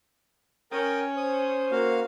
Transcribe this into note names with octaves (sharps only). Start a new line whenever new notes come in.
C#4 A#4 G5 D#6
C5 D#6
A#3 F#4 F5